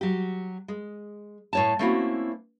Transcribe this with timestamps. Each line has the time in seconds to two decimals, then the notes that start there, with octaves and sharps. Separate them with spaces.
0.01 F#3 G4
0.68 G#3
1.53 A2 C#5 A5
1.79 A3 A#3 C4 C#4 E4 F#4